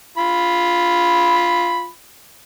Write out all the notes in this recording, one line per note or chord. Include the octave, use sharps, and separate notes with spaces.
F4 B5